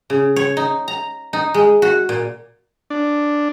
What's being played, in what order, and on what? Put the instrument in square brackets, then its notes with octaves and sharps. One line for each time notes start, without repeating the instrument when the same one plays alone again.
[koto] C#3
C#5
D#4
A#5
D#4
G#3
F#4
A#2
[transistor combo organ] D4